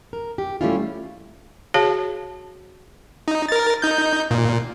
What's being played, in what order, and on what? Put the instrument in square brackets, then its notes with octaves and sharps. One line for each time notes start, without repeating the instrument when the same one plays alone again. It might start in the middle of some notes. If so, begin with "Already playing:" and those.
[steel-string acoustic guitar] A#4
G4
G3 A3 C4 C#4 E4 F4
[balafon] F#4 G#4 C#5 F5 A5
[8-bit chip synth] D#4
A#4 A6
D#4 G6
A#2